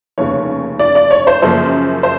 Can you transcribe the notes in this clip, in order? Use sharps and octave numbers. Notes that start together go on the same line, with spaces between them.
F1 D#2 C#3 C#5
D5
D5
C#5
C5
F#2 C#3 F3 A#3 C5
C5